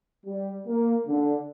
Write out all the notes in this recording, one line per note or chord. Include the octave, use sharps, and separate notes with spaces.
G3
A#3
D3